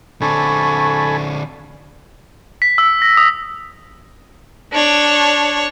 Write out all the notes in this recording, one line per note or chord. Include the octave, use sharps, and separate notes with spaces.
D3 C4 A4 G#5 B5 C#6
B6
E6
A#6
D#6
D4 C#5